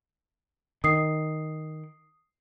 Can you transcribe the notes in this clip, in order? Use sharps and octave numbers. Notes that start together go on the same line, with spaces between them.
D#3 D#6 C7